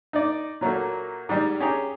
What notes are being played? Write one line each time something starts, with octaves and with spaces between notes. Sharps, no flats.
D#4 D5
A#2 F#3 A3 A#3
G#2 G3
C#4 G4 G#4 A#5